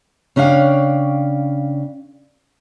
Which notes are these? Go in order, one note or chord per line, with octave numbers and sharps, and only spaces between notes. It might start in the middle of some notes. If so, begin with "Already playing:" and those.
C#3 C#4 D4 D#5 F5 G5